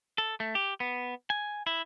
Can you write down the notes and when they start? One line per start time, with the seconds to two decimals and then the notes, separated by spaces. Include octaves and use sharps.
0.18 A4
0.40 A3
0.55 G4
0.80 B3
1.30 G#5
1.67 E4